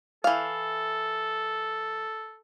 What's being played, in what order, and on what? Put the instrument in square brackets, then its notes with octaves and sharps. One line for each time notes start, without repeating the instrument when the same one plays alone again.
[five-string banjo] E3 F5 [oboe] A4